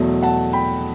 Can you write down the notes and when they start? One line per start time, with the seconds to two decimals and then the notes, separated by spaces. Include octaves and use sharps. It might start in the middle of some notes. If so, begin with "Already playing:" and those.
Already playing: E2 B2 F#3 A3
0.23 F#5 A5
0.53 G5 B5